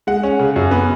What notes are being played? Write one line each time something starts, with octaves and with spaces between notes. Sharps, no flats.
G#3 F#5
C#4
C#3
F#2
B3